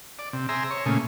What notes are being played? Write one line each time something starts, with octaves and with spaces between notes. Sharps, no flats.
D5
C3
G#4 C5 E5 A#5
C#5
A#2 C#3 A3 G#4